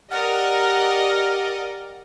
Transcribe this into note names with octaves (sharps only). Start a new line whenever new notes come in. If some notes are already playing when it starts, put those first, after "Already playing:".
G4 A#4 D5 D#5 F#5 F6